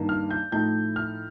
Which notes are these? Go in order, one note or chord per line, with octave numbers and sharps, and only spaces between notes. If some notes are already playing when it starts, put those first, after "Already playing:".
Already playing: G2 D#3 A#3 D#4
F6
G6
A2 F3 A3 D#4 G6
F6